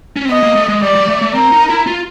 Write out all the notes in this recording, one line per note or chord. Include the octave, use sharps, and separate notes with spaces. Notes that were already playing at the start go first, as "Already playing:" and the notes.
C#4
C4
B3 D#5
A#3
A3
G#3
G3 D5
G3
A3
A3
C4 A#4
D#4
E4
F4